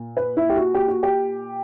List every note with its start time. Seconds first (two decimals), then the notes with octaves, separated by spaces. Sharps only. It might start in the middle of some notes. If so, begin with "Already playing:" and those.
Already playing: A#2
0.17 B4
0.37 E4
0.49 G4
0.56 F#4
0.74 G4
0.88 F#4
1.03 G4